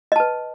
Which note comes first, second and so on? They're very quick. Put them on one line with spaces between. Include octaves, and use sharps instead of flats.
D#5 A5 B4